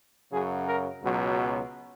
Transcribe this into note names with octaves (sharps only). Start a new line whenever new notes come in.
F#2 C#3 F#3 G#4
A#4
C#2 B2 F#3